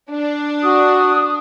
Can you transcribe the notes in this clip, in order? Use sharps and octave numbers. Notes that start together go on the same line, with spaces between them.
D4
F#4 D#6